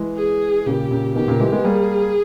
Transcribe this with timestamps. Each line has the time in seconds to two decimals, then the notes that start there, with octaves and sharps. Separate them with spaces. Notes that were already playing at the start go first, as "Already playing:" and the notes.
Already playing: E3 G#3
0.17 G#4
0.66 A#2 C#3 G4
0.91 A#2 C#3
1.16 B2 D#3 G4
1.28 A#2 C#3
1.40 E3 G#3
1.52 G#3 B3
1.64 G3 A#3 G#4